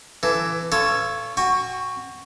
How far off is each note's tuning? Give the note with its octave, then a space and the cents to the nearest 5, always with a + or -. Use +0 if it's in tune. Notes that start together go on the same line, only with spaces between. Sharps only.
E3 +20 A4 +0
F4 -25 A4 +0 C#5 +0
F#4 +0 G5 +35 C#6 +0